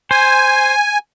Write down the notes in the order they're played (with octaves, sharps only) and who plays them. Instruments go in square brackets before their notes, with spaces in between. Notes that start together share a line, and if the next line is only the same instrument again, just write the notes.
[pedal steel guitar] C5 [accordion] G#5